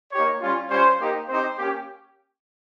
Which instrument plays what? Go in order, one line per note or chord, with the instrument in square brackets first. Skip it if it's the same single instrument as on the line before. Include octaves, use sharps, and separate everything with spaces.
[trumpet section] A#3 D#4 G4 C#5
G3 C#4 F4
G3 C#4 F4 C5
A#3 D#4 G4
C4 D#4 G4 C5
A#3 C#4 G4